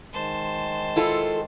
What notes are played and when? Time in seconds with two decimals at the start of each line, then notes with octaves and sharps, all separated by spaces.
0.13 D#3 G#3 C5 A5
0.96 E4 F4 A4